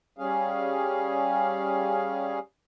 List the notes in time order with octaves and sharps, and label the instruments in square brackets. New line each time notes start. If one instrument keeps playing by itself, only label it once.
[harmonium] G3 C#4 G#4 F5